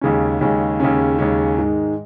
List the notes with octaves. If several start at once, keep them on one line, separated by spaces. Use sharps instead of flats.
D#2 C#3 G#3 C#4
D#2 C#3 G#3 C#4
D#2 C#3 G#3 C#4
D#2 C#3 G#3 C#4
G#2 D#3 G#3